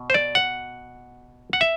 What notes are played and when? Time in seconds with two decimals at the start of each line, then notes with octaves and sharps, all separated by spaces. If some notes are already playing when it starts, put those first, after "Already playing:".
Already playing: B2
0.10 C5
0.14 D5
0.35 F#5
1.53 F#5
1.61 E5